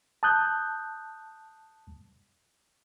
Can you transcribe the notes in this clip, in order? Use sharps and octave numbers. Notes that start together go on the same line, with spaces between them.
A5 D#6 F#6 G6